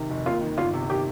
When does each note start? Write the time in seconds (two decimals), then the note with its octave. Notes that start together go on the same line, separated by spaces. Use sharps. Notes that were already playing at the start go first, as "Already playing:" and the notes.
Already playing: C3 D#3
0.10 F1
0.26 D#2 F4
0.41 D#3
0.57 G1 F4
0.73 C3
0.89 D#3 G4